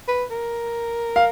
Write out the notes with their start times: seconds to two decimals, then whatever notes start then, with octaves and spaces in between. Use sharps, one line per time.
0.08 B4
0.31 A#4
1.16 F5